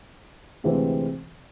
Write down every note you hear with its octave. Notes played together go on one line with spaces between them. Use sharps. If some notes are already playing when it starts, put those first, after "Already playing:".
D2 C3 E3 G#3 C4